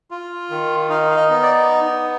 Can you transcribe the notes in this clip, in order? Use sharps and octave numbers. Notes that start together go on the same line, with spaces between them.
F4
D#3
D#4 F5
F5
D#5
B3
D5